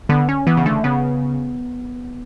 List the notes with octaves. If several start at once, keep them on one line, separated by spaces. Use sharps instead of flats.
D3 B3
C#4
E3 B3
C#3
D3 A3
C#3 B3